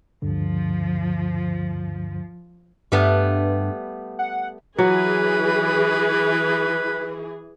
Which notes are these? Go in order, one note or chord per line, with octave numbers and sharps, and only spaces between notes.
D2 G2 D3 F3
G2 G3 A3 B3
F#5
E3 F#3 G#4 B4